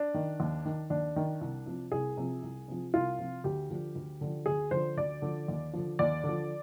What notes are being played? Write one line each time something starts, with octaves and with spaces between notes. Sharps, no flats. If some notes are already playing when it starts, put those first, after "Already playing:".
Already playing: D4
D#3
D#2
D#3
D#2 D4
D#3
C2
C3 F3
C2 G#4
C3 F3
C2
C3 F3
C2 F4
C3 F3
D2 G4
D3 F3
D2
D3 F3
D2 G#4
D3 F3 C5
D2 D5
D3 F3
D#2
D3 F3
D#2 D5
D3 F3